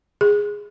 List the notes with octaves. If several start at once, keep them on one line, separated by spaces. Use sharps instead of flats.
G#4